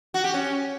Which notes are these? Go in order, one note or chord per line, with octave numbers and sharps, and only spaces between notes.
F#4
G4
C#4